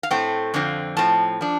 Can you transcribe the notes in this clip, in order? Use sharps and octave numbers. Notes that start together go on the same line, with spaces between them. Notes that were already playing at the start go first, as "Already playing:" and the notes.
F5
A2 A3 C4 G5
F2 D3 F3 C4
A2 F3 C4 A5
F3 D4